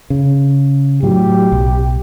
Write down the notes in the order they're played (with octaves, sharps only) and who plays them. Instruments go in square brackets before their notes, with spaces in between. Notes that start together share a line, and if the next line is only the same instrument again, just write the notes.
[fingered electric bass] C#3
[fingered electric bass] A2 F#3 [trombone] G4
[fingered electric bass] B1